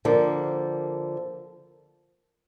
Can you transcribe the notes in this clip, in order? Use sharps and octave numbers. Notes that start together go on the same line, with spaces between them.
D3 F3 A#3